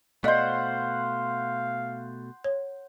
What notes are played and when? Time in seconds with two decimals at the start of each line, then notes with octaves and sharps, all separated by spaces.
0.24 B2 A3 C5 D5 D#5 F5 F#5
2.44 C#5